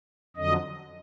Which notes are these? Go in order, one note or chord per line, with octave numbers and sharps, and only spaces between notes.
F2 D3 F#3 D#5